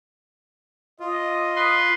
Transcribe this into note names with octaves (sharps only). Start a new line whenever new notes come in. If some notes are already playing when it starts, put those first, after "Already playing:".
F4 D#5
B4 C6